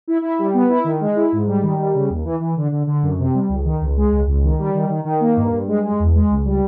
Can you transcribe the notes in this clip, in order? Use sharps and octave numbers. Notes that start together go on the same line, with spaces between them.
E4
E4
G3
B3
E4
D#3
G#3
E4
G#2
G3
D#3
G3
C#3
D#2
E3
E3
D3
D3
D3
F#2
C3
G3
C#2
D#3
C#2
G#3
C#2
C#2
D#3
G3
D#3
D#3
D#3
A#3
G2
G2
G#3
G#3
E2
G#3
C#2
G3